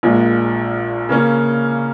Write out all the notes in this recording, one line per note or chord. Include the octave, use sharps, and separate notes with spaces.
A#1 A#2 G#3
C#3 A#3 C#4